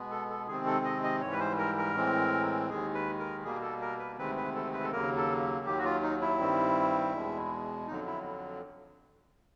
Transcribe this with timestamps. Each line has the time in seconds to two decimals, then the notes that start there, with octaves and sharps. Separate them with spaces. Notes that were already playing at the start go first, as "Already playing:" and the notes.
Already playing: B2 G#3 B3
0.11 A4
0.30 A4
0.48 C3 D#3 G#3 C4 G#4
0.66 A4
0.85 D#5
1.04 D#5
1.21 G#2 E3 G3 C#5
1.32 B4
1.40 C5
1.58 A#4
1.78 A#4
1.95 A2 E3 G#3 C4
2.69 D#2 D#3 G#3 G#4
2.94 B4
3.19 A#4
3.44 B2 G3 A#3 G#4
3.62 A4
3.81 A#4
3.99 B4
4.18 D2 C3 D#3 G#3 C4 B4
4.37 B4
4.55 A4
4.73 B4
4.83 A4
4.92 D#2 C#3 F#3 A#3 A#4
5.16 A4
5.66 D#2 D#3 F#3 G4
5.78 F#4
5.84 F4
6.03 D#4
6.21 E4
6.39 G2 D#3 G3 C4
7.14 E2 B2 G#3
7.87 F2 D3 F#3 D#4
8.06 E4